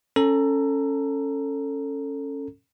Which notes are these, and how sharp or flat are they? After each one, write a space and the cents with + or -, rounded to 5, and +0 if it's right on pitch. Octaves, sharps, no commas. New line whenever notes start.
C#4 -10 A4 +15 A#5 +0